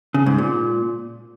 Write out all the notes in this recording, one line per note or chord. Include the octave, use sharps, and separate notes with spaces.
C#3
G#2
A#2